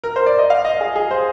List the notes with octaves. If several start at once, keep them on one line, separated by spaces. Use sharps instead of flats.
A#4
C5
D5
D#5
F5
D#5
G#4
G#4
C5